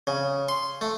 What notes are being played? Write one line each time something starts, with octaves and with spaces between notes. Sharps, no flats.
C#3
C6
A3